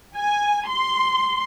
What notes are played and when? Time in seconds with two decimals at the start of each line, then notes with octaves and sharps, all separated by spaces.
0.16 G#5
0.67 C6